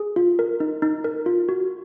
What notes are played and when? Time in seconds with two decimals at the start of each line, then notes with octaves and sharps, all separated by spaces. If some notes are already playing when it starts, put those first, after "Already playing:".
Already playing: G#4
0.16 F4
0.39 A#4
0.60 D#4
0.82 D#4
1.04 A#4
1.26 F4
1.49 F#4